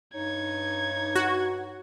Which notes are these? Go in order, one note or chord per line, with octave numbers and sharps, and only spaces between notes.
G2 D#4 C#5 G#6
F#4